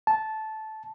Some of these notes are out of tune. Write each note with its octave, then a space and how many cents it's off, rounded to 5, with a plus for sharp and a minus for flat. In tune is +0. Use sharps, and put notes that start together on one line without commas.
A5 -10